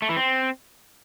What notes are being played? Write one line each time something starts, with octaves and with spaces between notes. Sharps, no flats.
A3
E3
C4